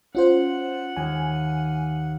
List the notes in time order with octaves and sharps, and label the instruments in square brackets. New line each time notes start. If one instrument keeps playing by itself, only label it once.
[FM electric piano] C#4 F4 C5 [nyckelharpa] F#5
[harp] D#2 [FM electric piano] G#5